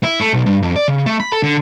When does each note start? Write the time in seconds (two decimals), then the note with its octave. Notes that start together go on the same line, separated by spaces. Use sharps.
0.03 E4
0.20 A3
0.33 B1
0.46 G2
0.62 F2
0.76 D5
0.88 C#3
1.06 A3
1.20 B5
1.32 A4
1.43 D3